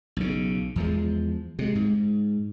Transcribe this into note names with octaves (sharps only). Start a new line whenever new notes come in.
B1 C#3
E2 F3 G#3
C3 G#3
G#2